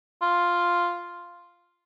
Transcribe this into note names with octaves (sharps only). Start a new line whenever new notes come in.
F4